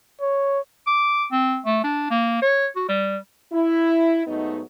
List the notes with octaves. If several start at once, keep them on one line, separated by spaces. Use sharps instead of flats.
C#5
D6
C4
A3
D4
A#3
C#5
F#4
G3
E4
G#2 F#3 A3 B3 D#4